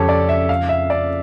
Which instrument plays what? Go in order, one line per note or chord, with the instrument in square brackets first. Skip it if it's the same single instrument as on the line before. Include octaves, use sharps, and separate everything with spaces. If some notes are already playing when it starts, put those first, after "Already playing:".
Already playing: [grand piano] F2 C#3 [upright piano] G4 A4 C#5
[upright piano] D5
E5
F5
E5
D5